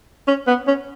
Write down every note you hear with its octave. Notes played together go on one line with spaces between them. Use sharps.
C#4
B3
C#4